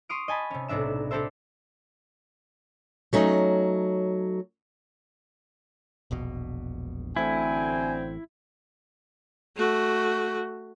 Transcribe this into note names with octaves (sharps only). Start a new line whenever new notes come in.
C6 C#6 D#6 F6 D7
D#5 G#5 A5 B5
C3 C#4
B1 A2 C3 D4 E5 E7
C4 D4 G4 A4 C5 E5
F#3 A3 C#4 D#4
E1 A#1 B2
A1 D2 A2 D3 C4 E4 G#5
A3 F#4